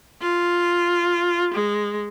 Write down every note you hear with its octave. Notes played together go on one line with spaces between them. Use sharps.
F4
G#3